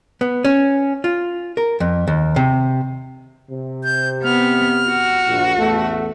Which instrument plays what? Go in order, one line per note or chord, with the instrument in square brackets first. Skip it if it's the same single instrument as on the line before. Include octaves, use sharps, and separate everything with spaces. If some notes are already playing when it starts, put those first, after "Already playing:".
[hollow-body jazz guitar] B3
C#4
F4
A#4
F2
D#2
C3
[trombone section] C3
[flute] G6
[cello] B3 [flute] F6
[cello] F#4
[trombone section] A#1
A1 E2 A3